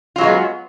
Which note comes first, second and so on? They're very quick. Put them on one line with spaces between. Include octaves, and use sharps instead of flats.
F4 F#3 G#3 A3 B3